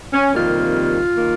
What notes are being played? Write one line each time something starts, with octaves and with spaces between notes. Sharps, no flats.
C#4
F2 C3 D#3 G3 A#3 F4
D#3 A#3